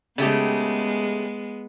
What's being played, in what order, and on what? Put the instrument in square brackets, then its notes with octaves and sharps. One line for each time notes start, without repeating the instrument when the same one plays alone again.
[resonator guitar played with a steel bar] C#3 A3 G4 [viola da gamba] G#3 B3